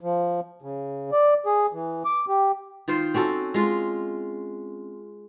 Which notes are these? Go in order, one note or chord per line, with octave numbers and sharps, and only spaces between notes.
F3
C#3
D5
G#4
E3
D6
G4
D#3 F4 C5
C4 C#4 F#4 A4
G#3 F4